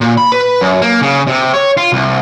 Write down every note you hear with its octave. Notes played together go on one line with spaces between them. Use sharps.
A#2
B5
B4
F#2
A#3
C#3
C3
C#5
F4
C2